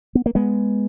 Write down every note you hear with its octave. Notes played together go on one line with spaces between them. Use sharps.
B3
A#3
G#3 B3